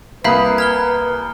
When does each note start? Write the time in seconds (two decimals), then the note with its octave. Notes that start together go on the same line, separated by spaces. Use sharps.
0.24 C2 A#3 B4 E5 F5 A#5 B5 D#6
0.58 A#5 F6 G#6 G7